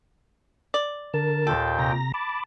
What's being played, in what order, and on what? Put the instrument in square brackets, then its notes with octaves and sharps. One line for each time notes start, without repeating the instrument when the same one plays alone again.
[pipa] D5
[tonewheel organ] D3 A#4 [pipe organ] A5
[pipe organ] D#2 A#2 G5 [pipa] A4
[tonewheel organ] C3 A#5 A#6
[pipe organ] A5 [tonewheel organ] B5 D6